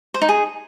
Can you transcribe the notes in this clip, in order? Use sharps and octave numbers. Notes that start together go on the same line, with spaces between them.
C5
D#4
G#4